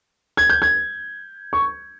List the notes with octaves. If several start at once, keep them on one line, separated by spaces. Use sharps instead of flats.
G#6
G6
G#6
C#6